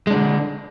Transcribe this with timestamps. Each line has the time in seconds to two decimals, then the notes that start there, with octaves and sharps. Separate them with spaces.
0.07 G#3
0.10 D4
0.14 D3